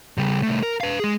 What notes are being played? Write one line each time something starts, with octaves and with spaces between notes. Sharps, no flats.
C#3 G3
C2 A3
A#4
B4 F5
G#3 G#4